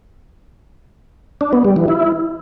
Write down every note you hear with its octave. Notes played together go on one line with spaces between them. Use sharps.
D4
B3
G3
E3
E4